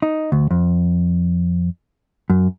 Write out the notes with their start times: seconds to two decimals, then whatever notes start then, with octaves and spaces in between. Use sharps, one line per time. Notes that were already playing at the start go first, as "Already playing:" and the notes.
0.02 D#4
0.32 D2
0.51 F2
2.30 F#2